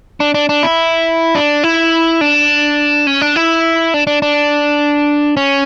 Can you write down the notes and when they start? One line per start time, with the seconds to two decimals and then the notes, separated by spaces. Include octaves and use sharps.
0.20 D4
0.34 D4
0.49 D4
0.63 E4
1.35 D4
1.64 E4
2.21 D4
3.07 C#4
3.21 D4
3.36 E4
3.94 D4
4.07 D4
4.22 D4
5.37 C#4